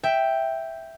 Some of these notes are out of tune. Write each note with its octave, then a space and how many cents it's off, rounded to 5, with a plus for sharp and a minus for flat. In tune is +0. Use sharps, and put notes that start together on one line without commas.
E5 +0 G5 +0